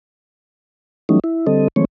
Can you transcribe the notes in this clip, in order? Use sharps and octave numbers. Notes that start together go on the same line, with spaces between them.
E3 F#3 G3 A3 C#4 D#4
E4
D3 G3 C4 A4 D#5
D#3 F3 G#3 A3 C4 C#5